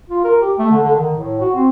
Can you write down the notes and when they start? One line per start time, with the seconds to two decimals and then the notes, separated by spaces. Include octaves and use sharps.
0.09 F4
0.24 A#4
0.41 G4
0.58 A3
0.71 D3
0.83 D3
0.95 D#3
1.16 A2
1.40 F#4
1.54 C4